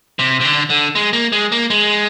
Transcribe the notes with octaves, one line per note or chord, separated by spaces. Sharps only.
C3
C3
D3
D3
G#3
A#3
G#3
A#3
G#3